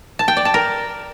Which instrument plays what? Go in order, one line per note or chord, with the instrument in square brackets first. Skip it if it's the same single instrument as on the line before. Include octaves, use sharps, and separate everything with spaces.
[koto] A5
G5
D5
A5
A#4